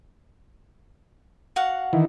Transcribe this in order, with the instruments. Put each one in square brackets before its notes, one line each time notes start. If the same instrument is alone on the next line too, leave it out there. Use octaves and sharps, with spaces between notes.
[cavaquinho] F#4 F5 F#5
[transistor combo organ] D#3 E3